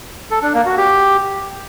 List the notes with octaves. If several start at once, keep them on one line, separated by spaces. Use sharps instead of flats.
A4
D4
A#3
F#4
G4